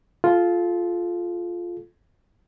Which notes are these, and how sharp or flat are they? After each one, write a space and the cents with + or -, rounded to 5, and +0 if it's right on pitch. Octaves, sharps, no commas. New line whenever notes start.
F4 +0 A4 -35